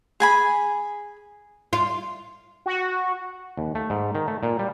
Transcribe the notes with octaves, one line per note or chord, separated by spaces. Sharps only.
G#4 G#5 B5
F4
F#4
D#2
A3
G#2
D#3
A3
A#2
G3